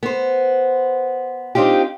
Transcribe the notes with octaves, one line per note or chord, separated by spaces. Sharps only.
B3 C5
C4 D4 D#4 F4 G4